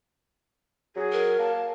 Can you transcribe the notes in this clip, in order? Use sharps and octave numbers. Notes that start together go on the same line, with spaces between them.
F#3 G#4
A#4
A#3 A5